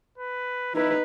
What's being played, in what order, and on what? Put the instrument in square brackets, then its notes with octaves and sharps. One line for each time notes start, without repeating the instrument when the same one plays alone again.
[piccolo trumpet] B4
[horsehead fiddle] D#4 B4 [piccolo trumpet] E4